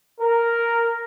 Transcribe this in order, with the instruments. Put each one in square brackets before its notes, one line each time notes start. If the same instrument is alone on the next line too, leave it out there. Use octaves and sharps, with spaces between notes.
[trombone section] A#4